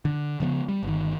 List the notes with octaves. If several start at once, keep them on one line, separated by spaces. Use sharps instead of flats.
D3
C#3 F3 A3 B3
G3
G1 D#3